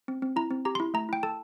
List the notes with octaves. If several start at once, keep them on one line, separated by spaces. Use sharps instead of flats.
C4
C4
E4 A#5
C4
G4 A#5
C6
E4
A3 A#5
E4 G5
A4 A5